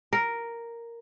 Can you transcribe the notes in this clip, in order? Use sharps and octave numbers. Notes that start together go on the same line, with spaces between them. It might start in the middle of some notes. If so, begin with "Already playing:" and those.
A#4